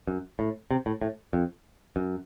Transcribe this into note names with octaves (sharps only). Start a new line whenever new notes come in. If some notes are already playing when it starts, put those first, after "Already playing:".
F#2
A2
C3
A2
A2
F2
F#2